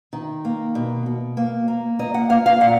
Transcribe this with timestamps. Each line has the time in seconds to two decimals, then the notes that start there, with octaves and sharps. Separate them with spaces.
0.13 D#3
0.45 A#3
0.75 B2
1.06 B2
1.37 A#3
1.68 A#3
1.99 A#3 D#5
2.14 F#5
2.30 A#3 F5
2.46 F5
2.60 A#2 F#5